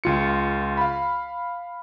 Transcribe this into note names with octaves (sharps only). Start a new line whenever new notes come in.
C#2 F4 C#7
F5 B5